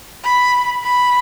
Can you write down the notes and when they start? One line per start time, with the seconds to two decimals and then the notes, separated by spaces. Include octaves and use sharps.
0.24 B5
0.84 B5